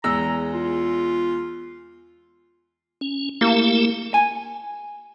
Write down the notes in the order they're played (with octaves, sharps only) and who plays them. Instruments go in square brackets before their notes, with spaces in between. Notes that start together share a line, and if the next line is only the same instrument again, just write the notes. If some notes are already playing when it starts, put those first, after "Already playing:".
[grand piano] E2 G#3 E6 [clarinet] A#5
[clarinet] F4
[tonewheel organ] C#4
[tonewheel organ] A3 E4 G4 [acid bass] A#3
[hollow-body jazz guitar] G#5